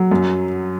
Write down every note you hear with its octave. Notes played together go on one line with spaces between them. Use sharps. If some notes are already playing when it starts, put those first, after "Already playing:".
Already playing: F#3
F#2